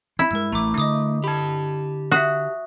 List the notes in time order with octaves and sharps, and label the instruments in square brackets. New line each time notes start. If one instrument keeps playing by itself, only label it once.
[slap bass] C4 [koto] E4
[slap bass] G2 G#3 [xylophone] A#4 E6
[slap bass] A1 [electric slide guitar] A3 [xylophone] A#5 D6
[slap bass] D3 [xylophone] D#5 D6 D#6
[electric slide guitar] G4 A5 [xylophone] B5 G#6
[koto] F#4 [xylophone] E5 D#6